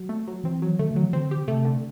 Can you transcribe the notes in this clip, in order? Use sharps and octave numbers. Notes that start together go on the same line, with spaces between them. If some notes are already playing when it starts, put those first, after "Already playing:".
Already playing: F#3
A3
F#3
E3 C4
F#3
D3 A3
D3
F#3
E3
D3 C4
G4
C3 A3
D3